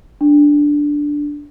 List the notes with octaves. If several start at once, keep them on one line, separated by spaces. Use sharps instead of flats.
D4